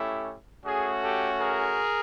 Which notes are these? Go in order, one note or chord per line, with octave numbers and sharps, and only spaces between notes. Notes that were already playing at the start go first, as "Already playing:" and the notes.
Already playing: A3 C#4 E4 G4
A3 C#4 F#4 G#4
G4 A4
G#4 A#4